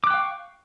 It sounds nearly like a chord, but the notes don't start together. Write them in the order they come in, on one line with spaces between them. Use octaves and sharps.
D6 F#6 G5 F5 C#6